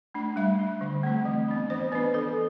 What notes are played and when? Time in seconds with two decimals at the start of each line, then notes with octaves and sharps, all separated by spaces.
0.14 A3 D4
0.36 G3 E5
0.59 D4
0.81 D3
1.03 A3 C4
1.25 E3
1.48 B3 D4
1.70 E3 C5
1.92 B3 B4
1.95 D4
2.14 E3 A4